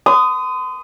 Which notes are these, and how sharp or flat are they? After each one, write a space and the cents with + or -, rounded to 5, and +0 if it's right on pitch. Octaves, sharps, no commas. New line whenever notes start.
C6 -40 D#6 +0